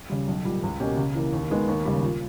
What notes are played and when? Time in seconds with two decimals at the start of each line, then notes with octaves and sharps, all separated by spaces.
0.10 C#3 G3
0.28 B1
0.45 A#2 G3
0.63 C#2
0.80 B2 A#3 C#4 G4
0.97 C#3
1.15 E3 A#3
1.33 D#2
1.50 D#3 G#3 B3
1.68 D#2
1.85 C#3 G3
2.03 A#2